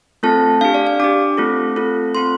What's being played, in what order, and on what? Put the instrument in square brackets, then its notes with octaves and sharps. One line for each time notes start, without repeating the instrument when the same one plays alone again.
[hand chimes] A3 C4 F4 A4 A5
D4 G4 F5
D5
F5
D4 G4 D6
A3 C4 F4 A4
A3 C4 F4 A4
C4 F4 A4 C6